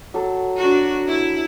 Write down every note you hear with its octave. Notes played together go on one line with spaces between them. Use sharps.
F#3 A4
D4 F#4
E4